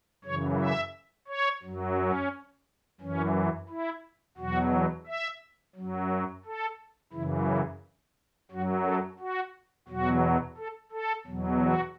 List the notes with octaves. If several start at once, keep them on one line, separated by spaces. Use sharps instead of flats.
F#2 C#3 E3 C#5
E5
C#5
F#2 F#3
C#4
F#2 E3 C#4
E4
E2 B2 F#3 F#4
E5
F#2 F#3
A4
F#2 C#3 E3 E4
E4
F#2 F#3 F#4
A4
F#4
E2 B2 F#3 F#4
A4
A4
E2 B2 F#3
F#4